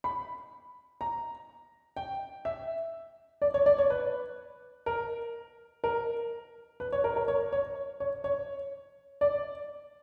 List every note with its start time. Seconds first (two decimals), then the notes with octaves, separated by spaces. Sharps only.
0.04 B5
1.01 A#5
1.97 G5
2.45 E5
3.42 D5
3.54 C#5
3.66 D5
3.78 C#5
3.90 B4
4.86 A#4
5.84 A#4
6.80 B4
6.92 C#5
7.04 A#4
7.16 A#4
7.28 C#5
7.53 C#5
8.00 C#5
8.24 C#5
9.21 D5